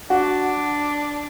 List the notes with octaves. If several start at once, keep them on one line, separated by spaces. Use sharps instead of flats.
D4 F#4